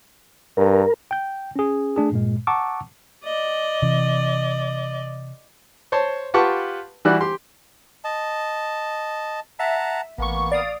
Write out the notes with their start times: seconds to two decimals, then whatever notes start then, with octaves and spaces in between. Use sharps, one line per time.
0.57 G2 A#4
1.11 G5 G6
1.56 C#4 G#4
1.96 A3 D4 G#4
2.12 G2 A#2 G#3
2.47 F#5 A5 A#5 C#6 D6 E6
3.24 D5 D#5
3.82 C3 E3
5.92 C5 C#5 A5 C6
6.34 F4 G4 B4 F#5 A5 C#6
7.05 E3 G3 E4 F#4 D5 F#6
7.21 G4 C6
8.04 D#5 A5
9.59 E5 F#5 A5 A#5
10.18 A1 A#3 B3 C#6
10.52 D5 F5 D#6